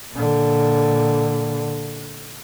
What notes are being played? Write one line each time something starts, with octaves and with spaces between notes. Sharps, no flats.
A#2 D3